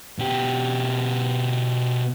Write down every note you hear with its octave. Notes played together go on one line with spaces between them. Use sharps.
B2 G4